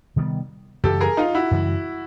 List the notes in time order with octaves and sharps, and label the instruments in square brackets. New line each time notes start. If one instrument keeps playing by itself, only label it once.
[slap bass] C3 D#3 G3 B3
[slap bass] F#2 C#3 E3 G3 [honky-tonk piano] G4 A4
[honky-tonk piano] G#4 A#4
D#4 F4
E4 F#4
[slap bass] F#2 C#3 E3 G3